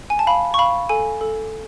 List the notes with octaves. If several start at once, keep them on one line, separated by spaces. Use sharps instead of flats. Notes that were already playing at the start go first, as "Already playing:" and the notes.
G#5
A5
F5 B5
C#6
F5 B5
A4 G#5
A4